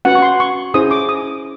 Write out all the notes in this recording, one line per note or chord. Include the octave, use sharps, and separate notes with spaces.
C#4 F#4 B4 F#5
C#6
C6
C#6
C#4 E4 G#4 C5 D#6
D6
D#6